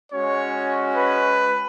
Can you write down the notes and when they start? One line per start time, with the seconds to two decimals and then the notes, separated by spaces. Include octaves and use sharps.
0.12 G#3 C#4 F#4 C#5
0.96 B4